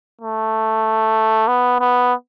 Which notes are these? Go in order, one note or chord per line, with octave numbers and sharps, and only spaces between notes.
A3
B3
B3